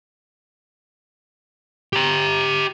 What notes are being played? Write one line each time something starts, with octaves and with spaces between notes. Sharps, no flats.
G4 A#5